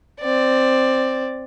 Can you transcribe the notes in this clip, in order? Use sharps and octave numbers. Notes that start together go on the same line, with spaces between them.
C4 D5